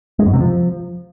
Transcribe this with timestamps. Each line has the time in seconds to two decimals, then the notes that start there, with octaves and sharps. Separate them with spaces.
0.19 G#3
0.26 F#2
0.33 C3
0.41 F3